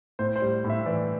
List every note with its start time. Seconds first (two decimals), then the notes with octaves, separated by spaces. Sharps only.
0.19 A2 C5
0.36 C5
0.42 G3
0.64 A2
0.70 E5
0.86 E3 D5